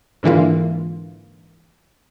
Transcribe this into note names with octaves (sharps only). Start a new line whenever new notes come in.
G#2 D3 E3 A#3 F4